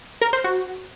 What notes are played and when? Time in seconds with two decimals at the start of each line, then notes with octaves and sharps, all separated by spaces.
0.21 A#4
0.33 C5
0.44 F#4